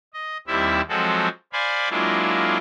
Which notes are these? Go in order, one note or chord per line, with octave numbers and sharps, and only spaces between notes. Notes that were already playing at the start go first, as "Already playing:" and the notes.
D#5
D#2 G3 C4 E4 E5
F3 F#3 G#3 C4 F#4 A4
C5 D5 F5 G#5 B5
F#3 G#3 A#3 D4 E4 F4